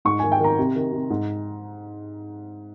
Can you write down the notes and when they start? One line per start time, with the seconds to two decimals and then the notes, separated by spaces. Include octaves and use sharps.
0.05 G#2 C#6
0.19 D#3 G#5
0.32 G5
0.40 D#3 A#5
0.58 C3
0.76 D#3
0.92 C3
1.10 G#2